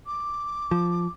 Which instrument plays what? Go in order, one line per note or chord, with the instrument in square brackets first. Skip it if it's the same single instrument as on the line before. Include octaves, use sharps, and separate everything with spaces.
[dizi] D6
[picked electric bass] F3